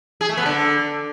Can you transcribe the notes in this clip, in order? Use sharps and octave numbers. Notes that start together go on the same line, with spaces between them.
G#4
A3
B3
D3